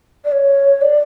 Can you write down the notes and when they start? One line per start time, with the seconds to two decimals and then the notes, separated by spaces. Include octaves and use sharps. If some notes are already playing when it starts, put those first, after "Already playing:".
0.25 D5
0.32 C#5
0.81 D5